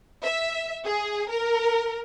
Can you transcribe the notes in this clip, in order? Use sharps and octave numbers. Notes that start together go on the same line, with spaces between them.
E5
G#4
A#4